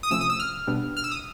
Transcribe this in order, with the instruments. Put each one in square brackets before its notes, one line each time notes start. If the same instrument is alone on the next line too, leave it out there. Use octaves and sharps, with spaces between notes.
[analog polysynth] D#6
[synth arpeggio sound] C3 F3 A3 C#4 [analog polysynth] E6
[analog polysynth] D#6
E6
F6
[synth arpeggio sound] B2 G3 B3 D4 G4
[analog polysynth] F6
E6
D#6